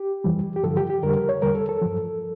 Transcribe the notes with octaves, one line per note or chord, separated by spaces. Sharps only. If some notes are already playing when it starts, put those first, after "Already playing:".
Already playing: G4
F2 E3 G3
G4
G2 D3 F3 A4
G4
G4
F2 D3 G3 A#4
A#4
C#5
E2 D3 G3 A#4
A4
A4
G2 F3